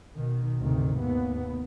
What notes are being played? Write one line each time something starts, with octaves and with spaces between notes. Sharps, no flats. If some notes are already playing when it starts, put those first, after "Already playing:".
B2 D#3
D2 G#2 C3 D#3
D#2 B3